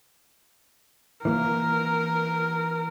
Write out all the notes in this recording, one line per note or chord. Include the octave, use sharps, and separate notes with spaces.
E3 A#3 A#4